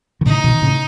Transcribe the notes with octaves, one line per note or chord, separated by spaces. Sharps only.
D#3
A2 C#3 D#4
B2 D#3
A2 C#3